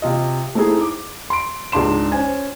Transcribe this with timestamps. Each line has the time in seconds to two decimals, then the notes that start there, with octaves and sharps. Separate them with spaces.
0.02 C3 F4 D#5
0.55 A3 C4 D#4 E4 G#4
0.81 D6
1.30 C6 D7
1.72 C#2 G#2 D4 C6 E7
2.12 C#4 C5 G#5